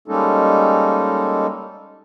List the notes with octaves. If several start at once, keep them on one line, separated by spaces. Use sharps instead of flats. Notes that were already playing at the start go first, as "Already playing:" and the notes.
G3 G#3 A#3 C#4 D#4 A4